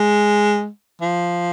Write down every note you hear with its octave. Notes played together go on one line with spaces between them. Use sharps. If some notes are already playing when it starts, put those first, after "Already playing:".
Already playing: G#3
F3